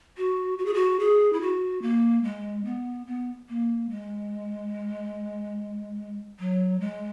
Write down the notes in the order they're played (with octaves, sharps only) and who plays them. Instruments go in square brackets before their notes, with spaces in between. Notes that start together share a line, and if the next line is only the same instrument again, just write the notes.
[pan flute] F#4
F#4
G#4
F#4
G#4
E4
F#4
A#3
G#3
B3
B3
A#3
G#3
F#3
G#3